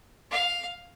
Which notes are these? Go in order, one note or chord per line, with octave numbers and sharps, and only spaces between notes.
F5